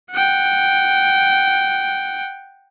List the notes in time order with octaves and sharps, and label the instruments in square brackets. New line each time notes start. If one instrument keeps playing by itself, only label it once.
[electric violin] F#5 G5